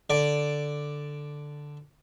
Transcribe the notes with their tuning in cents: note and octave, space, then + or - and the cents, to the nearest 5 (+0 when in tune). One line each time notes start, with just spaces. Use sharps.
D3 +0 D5 +0